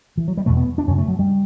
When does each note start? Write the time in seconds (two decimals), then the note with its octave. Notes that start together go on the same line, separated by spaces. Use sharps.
0.17 E3
0.28 F#3
0.37 G3
0.46 E2 B2 A3
0.57 B3
0.78 D4
0.88 F#2 C#3 C#4
0.98 A3
1.08 F#3
1.19 G3